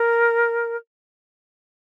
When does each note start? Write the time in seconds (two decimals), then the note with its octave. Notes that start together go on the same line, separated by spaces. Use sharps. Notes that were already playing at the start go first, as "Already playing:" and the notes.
Already playing: A#4